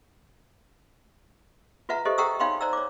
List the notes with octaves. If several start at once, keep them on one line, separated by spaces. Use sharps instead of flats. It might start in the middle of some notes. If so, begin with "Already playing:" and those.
F4 B4 E5 F#5 A#5
G4 A4 C5 D#5 E5
F#5 G5 A#5 C#6 D#6 E6
D#4 C#5 F5 G5 B5 C6
C5 D5 A#5 E6
C#5 D6